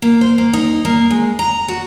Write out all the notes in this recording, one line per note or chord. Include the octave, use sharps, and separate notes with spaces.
A#3
C5
A#3
D#4
A#3
G#3
A#5
F#4